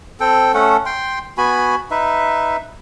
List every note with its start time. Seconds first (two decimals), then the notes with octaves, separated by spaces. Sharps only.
0.20 C4 A4 G5
0.54 A3 C#4 A4 F#5
0.86 G5 C6
1.38 B3 F#4 G#5 B5
1.91 D#4 B4 E5